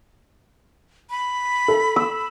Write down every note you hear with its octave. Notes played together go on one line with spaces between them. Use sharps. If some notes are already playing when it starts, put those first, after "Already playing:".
B5
A4
E6